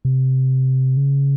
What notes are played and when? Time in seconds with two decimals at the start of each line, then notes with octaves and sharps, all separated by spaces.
0.05 C3
0.97 C#3